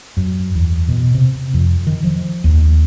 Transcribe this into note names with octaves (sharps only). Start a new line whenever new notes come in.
F#2
E2
B2
C3
F2
D#3
F3
D#2